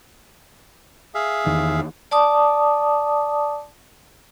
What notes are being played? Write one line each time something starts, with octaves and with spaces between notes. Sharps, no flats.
G#4 E5 F5
E2 D#3
D5 A5 D6 D#6